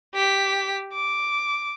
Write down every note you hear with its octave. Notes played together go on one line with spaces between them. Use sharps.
G4 B6
D6